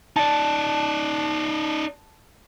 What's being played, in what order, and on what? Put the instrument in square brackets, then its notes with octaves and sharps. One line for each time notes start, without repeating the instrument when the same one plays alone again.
[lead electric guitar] D#4 D5 [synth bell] A5